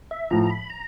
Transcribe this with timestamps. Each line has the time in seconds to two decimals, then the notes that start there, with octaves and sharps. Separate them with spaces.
0.11 E5
0.30 A2 F3 A#5
0.50 B5
0.70 A#5